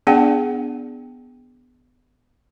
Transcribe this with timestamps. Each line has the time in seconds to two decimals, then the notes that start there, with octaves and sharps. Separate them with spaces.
0.07 B3 D4 G#4 D5 F#5 G5